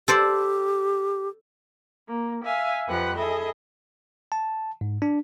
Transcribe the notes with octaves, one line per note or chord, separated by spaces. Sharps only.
G4 A4 C5 D5
A#3
E5 F5 G#5
F2 F3 G4 B4 F#5 F#6
E4 G#4 A4 D#5 E5
A5
G#2
D4